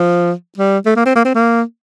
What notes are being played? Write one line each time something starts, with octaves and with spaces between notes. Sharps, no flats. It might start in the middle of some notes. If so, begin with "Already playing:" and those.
Already playing: F3
G3
A3
A#3
C4
A#3
C4
A#3